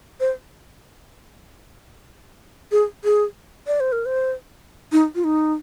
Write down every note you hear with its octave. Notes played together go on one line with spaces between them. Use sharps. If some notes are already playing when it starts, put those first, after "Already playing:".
C5
G#4
G#4
D5
C5
A#4
C5
D#4
F4
D#4